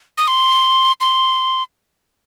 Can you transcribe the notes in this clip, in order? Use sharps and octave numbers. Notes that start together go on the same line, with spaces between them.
D#6
C6
C6